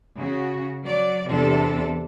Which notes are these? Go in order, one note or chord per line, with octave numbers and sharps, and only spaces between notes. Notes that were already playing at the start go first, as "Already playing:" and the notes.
C#3 F#4
F#3 D5
E2 C3 D4 A4